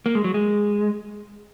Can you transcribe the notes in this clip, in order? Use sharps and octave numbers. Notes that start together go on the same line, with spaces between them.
A#3
G#3
F#3
G#3